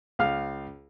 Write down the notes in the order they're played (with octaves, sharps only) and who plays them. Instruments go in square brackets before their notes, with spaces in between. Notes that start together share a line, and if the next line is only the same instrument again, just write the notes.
[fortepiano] C#2 F5 F6